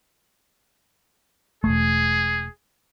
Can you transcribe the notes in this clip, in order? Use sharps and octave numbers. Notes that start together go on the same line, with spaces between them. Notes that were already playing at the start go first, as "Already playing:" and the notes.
E1 C#2 A3 G#4